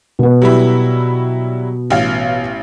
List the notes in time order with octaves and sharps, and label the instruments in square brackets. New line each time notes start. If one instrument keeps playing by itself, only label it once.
[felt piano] B2 B3
[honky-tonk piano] F#3 G3 E4
A1 F5